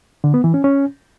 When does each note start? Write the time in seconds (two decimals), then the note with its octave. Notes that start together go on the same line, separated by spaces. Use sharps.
0.24 D3
0.34 B3
0.44 E3
0.54 C#4
0.64 C#4